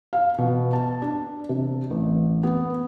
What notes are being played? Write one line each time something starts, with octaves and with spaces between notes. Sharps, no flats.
F5
B2
A5
D4
C3
A1
B3